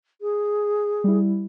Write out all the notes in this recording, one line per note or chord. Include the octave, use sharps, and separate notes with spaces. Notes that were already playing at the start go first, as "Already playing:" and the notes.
G#4
G3 E4